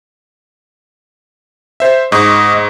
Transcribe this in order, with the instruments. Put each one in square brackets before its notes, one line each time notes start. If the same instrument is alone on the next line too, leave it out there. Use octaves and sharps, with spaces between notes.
[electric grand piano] C5 E5
[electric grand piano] G#2 C#6 [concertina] D#5